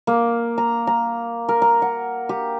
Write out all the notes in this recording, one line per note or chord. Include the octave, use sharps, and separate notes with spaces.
A#3
A#5
A#5
A#4
A#5
F#5
G4